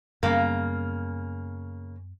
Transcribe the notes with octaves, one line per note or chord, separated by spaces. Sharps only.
F#2 C#3 G3 A#3 B3